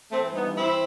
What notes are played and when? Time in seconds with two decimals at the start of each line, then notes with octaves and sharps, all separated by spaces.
0.11 E3 A3 C4
0.29 G2
0.35 B3 D#4
0.46 E3
0.57 C4 E4
0.62 E3